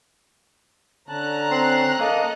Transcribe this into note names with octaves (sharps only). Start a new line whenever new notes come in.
D3 C#4 A5 A#5 F#6
C4 C6
A#3 A4 D#5